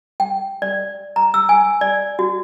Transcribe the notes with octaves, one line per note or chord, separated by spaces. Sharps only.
G5
D5
A#5
E6
G#5
D5
F#4